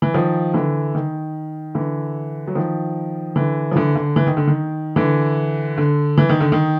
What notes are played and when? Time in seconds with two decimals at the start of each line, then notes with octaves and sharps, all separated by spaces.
0.02 E3
0.14 D#3 F3
0.54 D3 E3
0.95 D#3
1.75 D3 E3
2.48 F#3
2.55 D#3 F3
3.36 D3 E3
3.71 F3
3.76 D3 E3
3.95 D3
4.16 E3
4.27 D#3
4.37 D3
4.47 D#3
4.96 D3 E3
5.78 D3
6.17 E3
6.29 D#3
6.41 D3
6.52 D#3